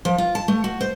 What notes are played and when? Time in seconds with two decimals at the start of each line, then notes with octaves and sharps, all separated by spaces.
0.05 F3
0.18 F4
0.35 A5
0.48 A3
0.64 F#4
0.81 C5